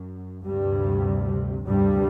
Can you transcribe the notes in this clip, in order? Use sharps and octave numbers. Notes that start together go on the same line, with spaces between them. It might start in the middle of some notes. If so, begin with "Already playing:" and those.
Already playing: F#2
D2 G2 C3 G3
D2 G2 C3 G3